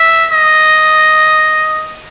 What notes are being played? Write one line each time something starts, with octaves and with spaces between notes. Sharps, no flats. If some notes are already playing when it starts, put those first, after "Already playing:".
Already playing: E5
D#5